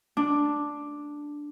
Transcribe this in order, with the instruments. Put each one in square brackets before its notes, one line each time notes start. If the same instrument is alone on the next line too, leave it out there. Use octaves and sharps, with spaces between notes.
[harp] D4